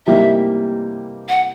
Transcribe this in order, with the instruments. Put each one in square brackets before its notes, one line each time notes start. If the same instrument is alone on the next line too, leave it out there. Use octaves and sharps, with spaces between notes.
[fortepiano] C3 E3 G3 A#3 D#4 [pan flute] E5
[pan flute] F#5